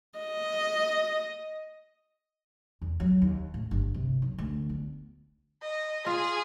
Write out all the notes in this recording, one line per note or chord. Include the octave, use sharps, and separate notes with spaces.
D#5
E2
F#3
D#2
A2
G1
C3
B1
D2
B3
D#5
F4 G#4